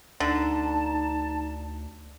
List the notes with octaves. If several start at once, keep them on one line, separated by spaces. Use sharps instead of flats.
D2 D3 D#4 A5